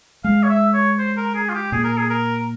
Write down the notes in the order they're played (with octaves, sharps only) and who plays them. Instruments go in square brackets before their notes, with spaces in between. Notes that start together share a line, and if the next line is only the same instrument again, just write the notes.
[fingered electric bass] G#3 [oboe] F5
[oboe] C#5
E5
C#5
C5
A#4
G#4
F4
G4
[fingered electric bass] A#2 [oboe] G#4
[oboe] A#4
G#4
A#4